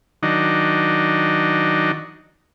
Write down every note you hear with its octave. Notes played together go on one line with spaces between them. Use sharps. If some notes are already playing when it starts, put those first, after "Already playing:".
D#3 F#3 D4 D#4